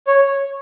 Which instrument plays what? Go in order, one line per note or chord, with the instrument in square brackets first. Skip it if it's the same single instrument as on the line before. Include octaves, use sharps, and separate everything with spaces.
[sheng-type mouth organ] C#5